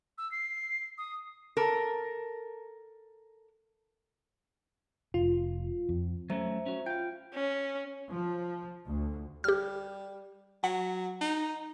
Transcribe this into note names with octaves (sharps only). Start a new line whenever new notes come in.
E6
C7
D#6
A4 A#4
F1 F4
F2
F#3 A3 C#4 C5 E5 A#5
C#4 F#4
F4 F5 G5
C#4
F3
D2
G3 G4 F6
F#3 F#5
D#4